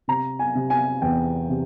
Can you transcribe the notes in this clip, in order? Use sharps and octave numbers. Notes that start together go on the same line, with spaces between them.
C3 A#5
G#5
C3
G#5
E2 G5
C3